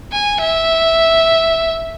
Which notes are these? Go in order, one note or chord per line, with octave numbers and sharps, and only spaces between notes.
G#5
E5